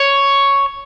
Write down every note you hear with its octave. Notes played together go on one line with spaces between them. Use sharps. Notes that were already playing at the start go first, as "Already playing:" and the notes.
Already playing: C#5